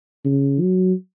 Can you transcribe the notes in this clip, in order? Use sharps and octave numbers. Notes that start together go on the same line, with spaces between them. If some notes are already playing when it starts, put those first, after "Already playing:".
C#3
F#3